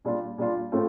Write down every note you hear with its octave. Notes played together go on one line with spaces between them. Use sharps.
A#2 G3 D4 F4
A#2 G3 D4 F4
A2 A3 C4 F4